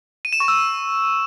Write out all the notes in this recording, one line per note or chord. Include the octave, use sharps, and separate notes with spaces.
D#7
E7
C#6
E6